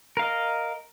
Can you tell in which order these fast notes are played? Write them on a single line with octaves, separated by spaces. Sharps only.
A#4 F5 D#5